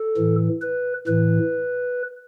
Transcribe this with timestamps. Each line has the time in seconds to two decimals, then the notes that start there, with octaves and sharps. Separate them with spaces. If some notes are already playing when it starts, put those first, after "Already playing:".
Already playing: A4
0.17 A2 E3
0.62 B4
1.07 A2 E3 B4